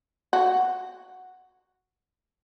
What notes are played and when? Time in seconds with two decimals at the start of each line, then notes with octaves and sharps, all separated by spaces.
0.33 F#4